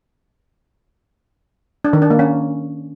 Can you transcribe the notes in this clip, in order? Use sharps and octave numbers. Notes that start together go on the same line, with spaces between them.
D4
D#3
D4
A#3
C#4